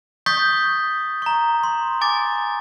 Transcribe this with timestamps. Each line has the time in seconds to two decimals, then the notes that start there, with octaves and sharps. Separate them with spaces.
0.26 C#6 D#6 G6 A6 B6
1.22 A#5 C#6
1.64 C6
2.01 G#5 D6 A6